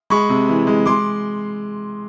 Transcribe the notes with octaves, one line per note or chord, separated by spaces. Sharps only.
G#3 B5 C#6
C3
E3
G#3
G#3 C6 D6